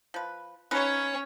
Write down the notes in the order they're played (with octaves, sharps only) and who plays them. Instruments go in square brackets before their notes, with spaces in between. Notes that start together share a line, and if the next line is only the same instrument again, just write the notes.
[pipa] F3 B4
[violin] C#4 C#5 [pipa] D#4 F4 B4